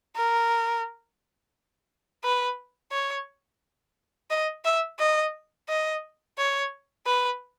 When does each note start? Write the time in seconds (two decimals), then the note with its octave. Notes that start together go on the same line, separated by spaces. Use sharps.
0.17 A#4
2.24 B4
2.92 C#5
4.30 D#5
4.65 E5
5.00 D#5
5.69 D#5
6.38 C#5
7.06 B4